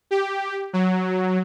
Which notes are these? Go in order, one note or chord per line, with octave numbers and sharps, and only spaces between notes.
G4
F#3